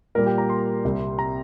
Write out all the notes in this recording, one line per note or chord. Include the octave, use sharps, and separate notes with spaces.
A#2 G3 A#3 A#4
G4
A#5
C6
C2 C3 G3
A#5